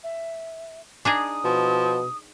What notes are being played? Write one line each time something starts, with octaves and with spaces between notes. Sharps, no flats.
E5
D4 D#4 G#4 D#6
B2 F3